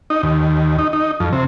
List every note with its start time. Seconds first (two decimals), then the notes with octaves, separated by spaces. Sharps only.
0.10 D#4
0.23 D#2
0.79 D#4
0.93 D#4
1.20 F2
1.33 C3